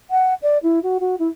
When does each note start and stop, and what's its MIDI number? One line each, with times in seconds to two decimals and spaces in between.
0.10 0.34 78
0.42 0.58 74
0.63 0.79 64
0.83 0.98 66
1.00 1.15 66
1.19 1.28 64